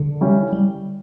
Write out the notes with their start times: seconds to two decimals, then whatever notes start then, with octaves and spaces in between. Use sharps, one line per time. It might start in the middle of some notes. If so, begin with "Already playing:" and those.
Already playing: D3
0.21 C#3 G3 C#4 E4 G4
0.52 G3